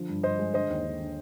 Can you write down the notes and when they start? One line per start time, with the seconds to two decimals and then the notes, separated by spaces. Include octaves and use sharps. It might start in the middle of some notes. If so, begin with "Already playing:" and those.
Already playing: D3 F3
0.09 G2
0.23 G2 C5 D#5
0.39 G#3
0.54 D3 C5 D#5
0.70 D#2
0.84 D3
1.00 D3